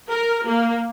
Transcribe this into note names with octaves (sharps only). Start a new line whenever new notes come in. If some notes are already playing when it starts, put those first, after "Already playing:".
A#4
A#3